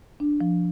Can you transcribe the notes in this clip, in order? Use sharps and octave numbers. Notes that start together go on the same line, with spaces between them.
D4
F3